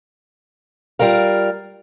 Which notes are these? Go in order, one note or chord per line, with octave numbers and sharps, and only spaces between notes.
G3 F4 A#4 F5